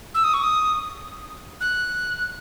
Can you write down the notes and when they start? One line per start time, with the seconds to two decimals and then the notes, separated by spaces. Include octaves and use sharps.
0.15 E6
0.24 D#6
0.34 C#6
0.43 D#6
1.61 F#6